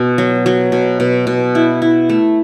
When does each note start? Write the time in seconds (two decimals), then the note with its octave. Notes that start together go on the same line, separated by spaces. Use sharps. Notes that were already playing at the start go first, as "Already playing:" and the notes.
Already playing: B2
0.18 F#3
0.46 F#3
0.72 B2
1.00 B2
1.27 B2
1.55 E4
1.82 E4
2.09 A3